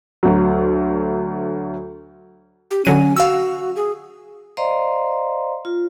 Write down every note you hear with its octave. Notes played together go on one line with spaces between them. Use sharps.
D2 F#3
G4
D3 F#3 C#4 D#7
F#4 F5 E6
G#4
C5 D5 D#5 F5 A#5 C6
F4